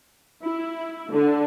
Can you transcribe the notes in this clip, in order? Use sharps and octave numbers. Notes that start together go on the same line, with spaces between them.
E4
D3